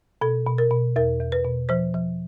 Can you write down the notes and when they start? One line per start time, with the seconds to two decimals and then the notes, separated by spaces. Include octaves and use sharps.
0.21 B2 A4
0.47 B2
0.58 A#4
0.71 B2
0.96 E2 A#4
1.21 E2
1.32 B4
1.44 B2
1.69 F3 C5
1.95 F3